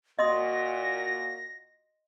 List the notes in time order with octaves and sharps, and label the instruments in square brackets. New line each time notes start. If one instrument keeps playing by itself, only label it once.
[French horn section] A#2 F#4 [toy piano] D#5 C6 D#6 [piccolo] A#6